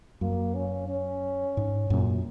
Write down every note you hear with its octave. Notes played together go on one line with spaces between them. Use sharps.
F#2 A#3
C#4
C#4
G#2
F#2 A#2